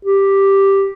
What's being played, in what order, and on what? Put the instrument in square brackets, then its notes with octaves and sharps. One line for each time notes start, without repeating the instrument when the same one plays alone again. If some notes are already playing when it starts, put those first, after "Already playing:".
[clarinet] G4